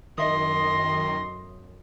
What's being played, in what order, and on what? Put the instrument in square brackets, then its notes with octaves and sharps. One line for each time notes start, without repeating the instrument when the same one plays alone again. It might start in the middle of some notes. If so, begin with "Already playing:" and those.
[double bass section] B1 F#2 [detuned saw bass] D#3 [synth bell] D#5 E5 D#6 [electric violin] C6 A#6